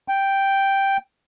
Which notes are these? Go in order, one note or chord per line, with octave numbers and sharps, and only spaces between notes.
G5